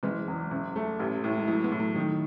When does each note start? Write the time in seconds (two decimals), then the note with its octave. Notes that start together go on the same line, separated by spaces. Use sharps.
0.03 F#1 E3 G#3
0.28 E2
0.51 F#1
0.75 A3
1.00 A1
1.24 A2
1.37 G#3
1.47 E3 F#3 A3
1.64 G#3 B3
1.72 A2
1.80 F#3 A3
1.95 D#3